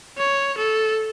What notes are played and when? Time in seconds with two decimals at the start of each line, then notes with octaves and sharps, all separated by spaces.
0.18 C#5
0.58 A4